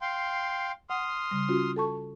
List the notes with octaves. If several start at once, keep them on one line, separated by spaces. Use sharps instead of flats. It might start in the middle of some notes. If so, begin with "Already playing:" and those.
F5 G5 C6
F#5 C6 D#6 F6
C#3 G3
C#4 F4 F#4
A4 A5 C#6